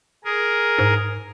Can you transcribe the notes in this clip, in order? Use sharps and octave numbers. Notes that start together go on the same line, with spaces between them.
G#4 A#4
G#2